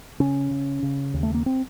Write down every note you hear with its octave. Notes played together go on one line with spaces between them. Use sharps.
C#3 C#4
C#3
C#3
D#2
A3
A#3
C4